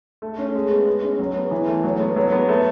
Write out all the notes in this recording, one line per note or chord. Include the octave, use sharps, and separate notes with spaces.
A3
C#4
G#3
B3
G#3
C#4
F#3
B3
E3
A3
F#3
B3
F#3
B3
A3